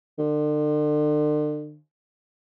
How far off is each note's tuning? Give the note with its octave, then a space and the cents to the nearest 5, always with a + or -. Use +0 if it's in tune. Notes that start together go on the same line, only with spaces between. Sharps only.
D3 +40